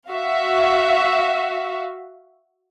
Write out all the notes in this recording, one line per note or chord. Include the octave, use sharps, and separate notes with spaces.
F#4 E5 F5